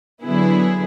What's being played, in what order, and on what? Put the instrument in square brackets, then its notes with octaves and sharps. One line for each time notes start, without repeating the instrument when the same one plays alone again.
[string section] D3 F#3 B3 E4 G#4